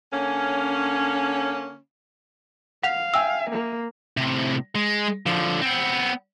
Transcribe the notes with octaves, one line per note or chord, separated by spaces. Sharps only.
D3 A#3 C#4
F5 F#5 F7
E5 G5 G#5 E6
A#3
A2 C3
G#3
D3 F3
B3 C4